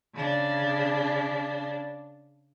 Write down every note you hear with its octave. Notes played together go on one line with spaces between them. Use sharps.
C#3 D4